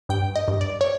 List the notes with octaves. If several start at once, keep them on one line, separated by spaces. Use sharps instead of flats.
G2 G5
D#5
G2
D5
C#5